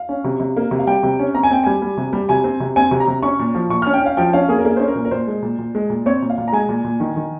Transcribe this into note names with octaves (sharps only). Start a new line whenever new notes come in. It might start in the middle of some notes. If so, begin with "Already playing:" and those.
Already playing: F5
C#4
C3
C3
A#3
C3
F5
G3 G5
C3
C#4
C4 A#5
G#5
C4 G5
G3 G#5
G3
C3
G3
C3 G#5
C4
C3
C4 G#5
C3
A#5
C3
C#4 C#6
A#2
F3
A#2 C#6
F6
C#4
G5
C#4 F5
F3 G5
C#4 F5
A#3 G#4
A#4
A#3 G#4
C#4 C5
A#4
A#2
A#4
A#2 C5
G#3
A#2
A#2
G#3
A#2
C4 C#5
A#2
F5
A#2
A#5
G#3 G#5
A#2
A#2
D#3
D#3